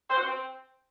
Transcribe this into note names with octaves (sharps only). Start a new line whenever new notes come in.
C5
F#4
C5
C4